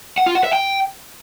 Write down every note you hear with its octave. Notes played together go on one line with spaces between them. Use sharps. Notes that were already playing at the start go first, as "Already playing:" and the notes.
F#5
F4
F#5
E5
G5